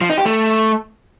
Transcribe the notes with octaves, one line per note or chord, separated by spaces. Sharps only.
F3
D#4
G4
A3